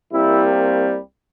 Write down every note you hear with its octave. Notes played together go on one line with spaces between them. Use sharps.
C2 C3 G3 A#3 E4